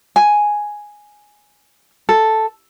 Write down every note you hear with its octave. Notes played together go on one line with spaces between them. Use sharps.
G#5
A4